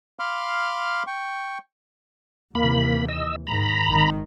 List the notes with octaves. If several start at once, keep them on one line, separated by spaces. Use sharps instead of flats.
F5 B5 C6 D6 F6
G5 C#6
D#2 C3 E3 A#3 B5
D#5 E6
G#2 D#3 A#5 B5
G#1 D#3